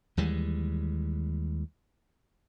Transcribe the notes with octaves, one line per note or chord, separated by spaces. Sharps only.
D#2 E3 G3 G#3